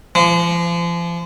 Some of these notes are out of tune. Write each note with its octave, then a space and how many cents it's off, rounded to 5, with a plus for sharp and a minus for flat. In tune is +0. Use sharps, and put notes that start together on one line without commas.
F3 -35